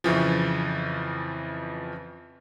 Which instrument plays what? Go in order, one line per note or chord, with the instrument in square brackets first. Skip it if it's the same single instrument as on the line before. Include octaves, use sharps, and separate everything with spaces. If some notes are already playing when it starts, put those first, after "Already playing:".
[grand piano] F2 C#3 E3 F3